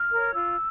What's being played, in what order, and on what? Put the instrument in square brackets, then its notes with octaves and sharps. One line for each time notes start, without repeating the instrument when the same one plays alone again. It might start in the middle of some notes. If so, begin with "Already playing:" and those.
Already playing: [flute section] F6
A#4 C#5
F4 E6